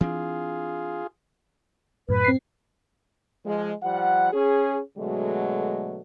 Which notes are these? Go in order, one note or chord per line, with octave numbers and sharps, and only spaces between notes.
E3 C4 D4 F4 G#4
F#2 A2 B4
C4 C7
F3 G#3
F3 G3 F#5
C#4 G#4
B2 D3 F#3 G#3 A3